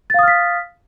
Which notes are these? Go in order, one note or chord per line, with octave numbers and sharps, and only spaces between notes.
F5 D#6 F6 A6 B6